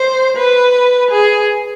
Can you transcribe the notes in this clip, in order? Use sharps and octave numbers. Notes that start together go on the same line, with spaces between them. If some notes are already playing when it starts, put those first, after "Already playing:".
Already playing: C5
B4
G#4